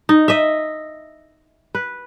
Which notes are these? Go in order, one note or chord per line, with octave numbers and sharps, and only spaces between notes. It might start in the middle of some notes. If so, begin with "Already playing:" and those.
D#4
D#5 E5
B4